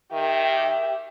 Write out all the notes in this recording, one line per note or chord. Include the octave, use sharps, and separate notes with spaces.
D#3 G4 E5